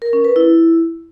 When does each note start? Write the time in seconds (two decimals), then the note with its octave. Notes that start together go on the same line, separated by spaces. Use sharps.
0.02 A#4
0.13 C#4
0.24 B4
0.36 E4